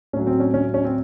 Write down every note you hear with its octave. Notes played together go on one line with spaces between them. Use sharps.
A2 F#3 C#4
C4
C#4
C#4
C#4
C4